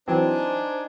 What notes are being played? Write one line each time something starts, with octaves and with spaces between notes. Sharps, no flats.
E3 F#3 C4 D4 D#4 C5 G#5 D6